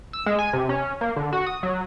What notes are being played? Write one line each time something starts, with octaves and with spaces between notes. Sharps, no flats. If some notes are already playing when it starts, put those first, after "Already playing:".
E6
G#3
G#5
C3
C#4
A#3
D3
F#4
D#6
F#3